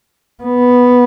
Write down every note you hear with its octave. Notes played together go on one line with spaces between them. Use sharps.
B3